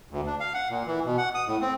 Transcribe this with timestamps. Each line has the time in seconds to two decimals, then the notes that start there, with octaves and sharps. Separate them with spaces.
0.11 D2
0.27 D4
0.40 F5
0.54 F#5
0.69 A#2
0.86 E3
1.05 B2
1.18 F#5
1.35 D#6
1.47 A2
1.62 C4